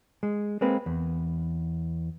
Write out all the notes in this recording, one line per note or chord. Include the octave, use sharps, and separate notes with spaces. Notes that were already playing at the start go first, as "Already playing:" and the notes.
G#3
G#3 A#3 C4 B4
E2